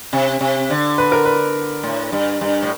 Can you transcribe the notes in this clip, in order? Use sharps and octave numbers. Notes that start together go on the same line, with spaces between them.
C3
C3
D3
B4
A#4
B4
A2
G2
G2
A2